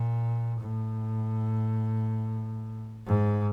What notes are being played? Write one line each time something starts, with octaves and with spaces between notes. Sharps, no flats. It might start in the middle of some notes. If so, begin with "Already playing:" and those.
Already playing: A#2
A2
G#2